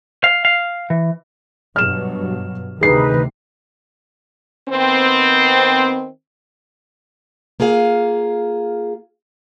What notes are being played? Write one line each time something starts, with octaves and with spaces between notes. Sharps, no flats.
F5
F5
E3
G2 B2 F#3 F6 E7
D2 C3 D#3 D#4 G#4 B4 C7
D#3 B3 C4
A#3 F4 G#4 F5